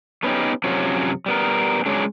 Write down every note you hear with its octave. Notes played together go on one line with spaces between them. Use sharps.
A3 B3 C#4 D#4 G4
F#2 C3 F3 C#4 F#4
G3 B3 A#4
F#3 G#3 C#4 D4